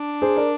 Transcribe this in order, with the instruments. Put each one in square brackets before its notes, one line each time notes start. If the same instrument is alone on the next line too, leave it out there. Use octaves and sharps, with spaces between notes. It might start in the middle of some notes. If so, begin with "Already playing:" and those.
Already playing: [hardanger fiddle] D4
[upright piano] G#4 C5
A#4 D5